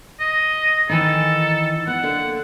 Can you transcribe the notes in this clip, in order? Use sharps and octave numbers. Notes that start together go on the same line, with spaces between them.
D#5
D#3 E3 D#4 A4
B3 F#5
D3 A#3 D4